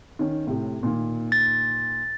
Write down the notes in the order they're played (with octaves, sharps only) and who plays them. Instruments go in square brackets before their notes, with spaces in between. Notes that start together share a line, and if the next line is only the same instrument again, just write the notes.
[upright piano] D#3 C#4
A2 C3
A#2 D#3
[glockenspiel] A6